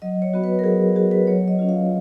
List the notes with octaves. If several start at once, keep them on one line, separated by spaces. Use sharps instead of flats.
F#3 D#5
C#5
B3 F#4
B4
A#4
F#3 G#4
B3 F#4 G#4
B4
F#3 C#5
D#5
C#4 F4
F5